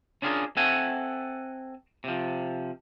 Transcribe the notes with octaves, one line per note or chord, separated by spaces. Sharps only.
C#4 D4 F4 G4 G#4 A#4
C4 A4 E5 F#5 G#5
C3 F3